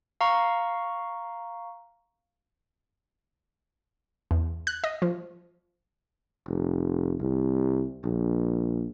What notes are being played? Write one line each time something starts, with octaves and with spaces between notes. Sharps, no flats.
F5 A#5 C#6
E2
F#6
D#5
F3
F1
C2
A#1